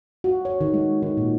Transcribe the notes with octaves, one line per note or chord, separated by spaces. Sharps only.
F#4
C#5
D#3
G#3
D#3
A#2